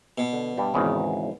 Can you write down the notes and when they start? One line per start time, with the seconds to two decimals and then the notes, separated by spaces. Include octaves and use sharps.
0.18 B2
0.33 D3
0.57 G2 G3
0.74 G#1 E2 C#3